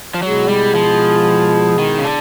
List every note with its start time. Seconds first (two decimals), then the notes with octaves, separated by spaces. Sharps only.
0.14 F3
0.23 B2 F#3 G#3 B3 E4 G#4
0.49 G3
0.75 F3
1.79 D#3
1.98 C#3
2.04 D3